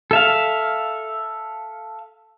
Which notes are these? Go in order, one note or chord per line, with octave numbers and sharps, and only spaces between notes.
A4 E5 F5